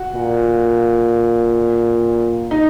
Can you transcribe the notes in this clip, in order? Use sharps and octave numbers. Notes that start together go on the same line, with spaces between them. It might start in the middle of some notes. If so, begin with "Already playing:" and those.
Already playing: F#4
A#2
D#4